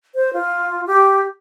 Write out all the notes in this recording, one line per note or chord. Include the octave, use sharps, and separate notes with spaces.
C5
F4
G4